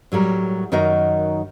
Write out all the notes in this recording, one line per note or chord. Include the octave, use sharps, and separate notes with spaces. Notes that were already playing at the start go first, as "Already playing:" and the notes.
A2 F#3 G3 A#4
F#2 D#3 D#4 F#4 A#4 D#5